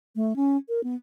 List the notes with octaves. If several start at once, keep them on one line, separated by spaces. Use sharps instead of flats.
A3
C#4
A#4
B3